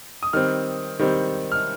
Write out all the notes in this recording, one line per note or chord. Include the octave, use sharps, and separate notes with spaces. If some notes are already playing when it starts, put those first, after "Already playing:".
D#6
D#3 G3 C4 F6
D#3 G3 C4
F6